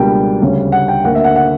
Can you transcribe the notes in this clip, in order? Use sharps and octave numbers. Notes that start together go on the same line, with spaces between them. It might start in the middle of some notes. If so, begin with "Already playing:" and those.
Already playing: C#2 B2 G3 A#3 D4 G5
D2 C#3 G3 C#4
F#5
G5
D2 D3 A#3 F#5
E5
F#5
F#5